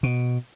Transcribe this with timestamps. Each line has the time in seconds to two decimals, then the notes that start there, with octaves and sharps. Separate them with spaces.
0.03 B2